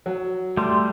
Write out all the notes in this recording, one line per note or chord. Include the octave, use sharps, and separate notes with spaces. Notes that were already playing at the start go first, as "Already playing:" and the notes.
F#3
G3 A3 G4 C6